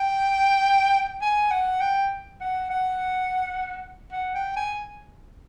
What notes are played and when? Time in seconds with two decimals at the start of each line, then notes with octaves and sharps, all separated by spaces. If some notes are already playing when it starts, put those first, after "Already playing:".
Already playing: G5
1.22 G#5
1.51 F#5
1.81 G5
2.41 F#5
2.70 F#5
4.12 F#5
4.35 G5
4.56 G#5